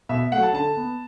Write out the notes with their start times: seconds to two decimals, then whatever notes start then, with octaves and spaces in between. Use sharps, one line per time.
0.09 B2 E5
0.32 F#3 A3 F#5
0.43 A5
0.53 D3 A5
0.77 B3